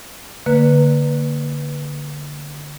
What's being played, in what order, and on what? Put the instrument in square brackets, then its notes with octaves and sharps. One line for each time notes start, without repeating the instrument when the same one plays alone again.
[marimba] D3 A#3 B4